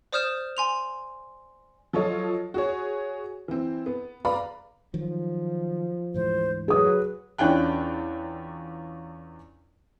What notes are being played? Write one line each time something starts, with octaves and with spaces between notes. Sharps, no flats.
C5 D5 D#6 F6 G6 E7
G#5 C6 F7
F3 F#3 F4 A4 C#5 D#5
F#4 G#4 C#5
E3 C4
B3
B4 D5 F5 A#5 B5
D#3 F3 F#3
D2 G#2 E3 C5
F#3 G#4 B4 D#6
E2 C#4 D4 F4 G5 F#6